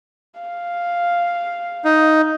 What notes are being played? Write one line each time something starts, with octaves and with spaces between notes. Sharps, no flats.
F5
D#4